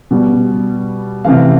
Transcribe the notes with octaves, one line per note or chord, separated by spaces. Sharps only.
B2 G3
C3 E3 A3 F5